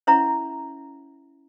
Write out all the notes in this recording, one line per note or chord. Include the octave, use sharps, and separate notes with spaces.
C#4 E4 C#5 E5 F#5 A#5